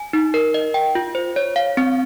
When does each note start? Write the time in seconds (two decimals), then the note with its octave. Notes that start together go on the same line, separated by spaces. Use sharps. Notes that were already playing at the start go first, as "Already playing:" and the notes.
Already playing: G#5
0.13 D#4
0.34 A#4
0.54 D#5
0.74 G5
0.95 F4
1.15 C5
1.36 C#5
1.56 F5
1.77 C4